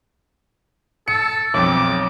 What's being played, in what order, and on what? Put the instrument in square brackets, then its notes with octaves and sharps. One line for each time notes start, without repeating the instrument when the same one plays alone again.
[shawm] A4 [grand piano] C#7
[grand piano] B1 F2 [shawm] D6